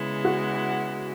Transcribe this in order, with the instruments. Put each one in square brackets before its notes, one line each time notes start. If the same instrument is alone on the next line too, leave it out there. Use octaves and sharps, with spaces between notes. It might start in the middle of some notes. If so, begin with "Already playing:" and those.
Already playing: [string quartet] C#3 G#3 B3 E4
[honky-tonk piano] F#4